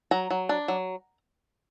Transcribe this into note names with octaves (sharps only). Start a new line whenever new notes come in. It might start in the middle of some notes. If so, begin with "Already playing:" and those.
F#3 A#5
F#3
D4
F#3